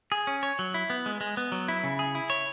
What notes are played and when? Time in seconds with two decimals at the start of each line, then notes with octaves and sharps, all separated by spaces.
0.12 G#4
0.27 C#4
0.43 C#5
0.59 F#3
0.74 E4
0.90 B3
1.06 G#3
1.21 G#3
1.37 B3
1.52 F#3
1.68 E4
1.84 C#3
1.99 G#4
2.15 E4
2.30 C#5